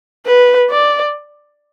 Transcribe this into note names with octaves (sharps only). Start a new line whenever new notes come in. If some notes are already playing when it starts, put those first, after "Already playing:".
B4
D5